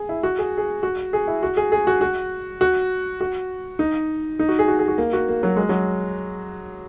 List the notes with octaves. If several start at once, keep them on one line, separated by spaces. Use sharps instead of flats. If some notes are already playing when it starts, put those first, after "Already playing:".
Already playing: G#4
E4
F#4
G#4
G#4
F#4
G#4
E4
F#4
G#4
G#4
F#4
F#4
F#4
F#4
D#4
D#4
F#4
G#4
F#4
G#4
F#4
A#3
F#4
A#3
F#3
G#3
F#3